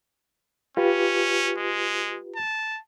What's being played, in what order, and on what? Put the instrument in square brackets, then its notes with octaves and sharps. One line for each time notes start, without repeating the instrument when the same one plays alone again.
[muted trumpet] C#4 [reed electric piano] F4 G4 B4
[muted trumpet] G#3
A5